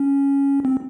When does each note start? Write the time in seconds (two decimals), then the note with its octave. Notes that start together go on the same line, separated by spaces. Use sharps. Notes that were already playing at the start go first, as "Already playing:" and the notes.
Already playing: C#4
0.65 C4